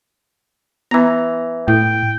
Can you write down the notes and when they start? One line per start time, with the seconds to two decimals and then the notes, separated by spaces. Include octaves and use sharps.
0.91 E3 B3 A#5
1.68 A2 E4 G5